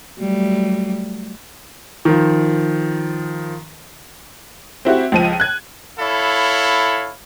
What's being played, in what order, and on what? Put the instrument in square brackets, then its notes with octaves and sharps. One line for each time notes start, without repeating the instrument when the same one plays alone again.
[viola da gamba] F#3 G3 A3
[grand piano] D#3 F3
[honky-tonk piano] C4 E4 F#4 G4
C#2 F3 D#7
F#6 G#6
[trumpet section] E4 A4 C#5 F5 B5